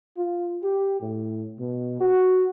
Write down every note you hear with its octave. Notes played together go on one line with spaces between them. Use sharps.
F4
G4
A2
B2
F#4